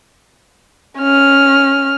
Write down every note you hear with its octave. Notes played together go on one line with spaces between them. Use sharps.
C#4 F6